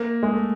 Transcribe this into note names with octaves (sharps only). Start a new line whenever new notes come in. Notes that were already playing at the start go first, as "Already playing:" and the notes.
Already playing: A#3
G#3
A3